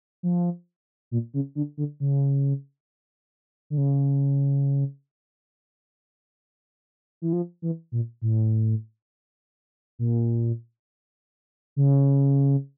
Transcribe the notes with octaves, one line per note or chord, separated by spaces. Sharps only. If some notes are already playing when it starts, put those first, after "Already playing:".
F3
A#2
C#3
D3
D3
C#3
D3
C#3
E3
F3
E3
A#2
A2
A#2
C#3